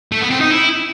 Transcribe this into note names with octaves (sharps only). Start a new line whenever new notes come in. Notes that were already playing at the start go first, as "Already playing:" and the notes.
A3
B3
C4
D#4
E4